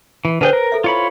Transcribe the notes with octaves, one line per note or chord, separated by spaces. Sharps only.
E3
D3 G#4 B4 C5 G5
A#4
A4 E5
E4 F4 C#5 B5